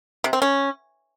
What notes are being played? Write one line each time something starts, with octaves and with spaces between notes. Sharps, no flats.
C3
C4
C#4